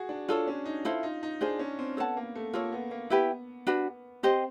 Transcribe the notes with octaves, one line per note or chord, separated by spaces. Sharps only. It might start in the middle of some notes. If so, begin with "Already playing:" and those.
Already playing: F#4 G#4
D4
D4 F4 A4 C#5
C#4
D#4
E4 F4 A4 C5
D#4
D#4
D4 F4 G#4 C5
C#4
C4
B3 A4 C#5 F#5 A5
A#3
A3
A#3 F4 A4 C#5
B3
A#3
B3 E4 G4 B4
D4 F#4 B4
C4 G4 C5 D#5